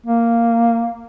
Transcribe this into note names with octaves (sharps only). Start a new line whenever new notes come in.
A#3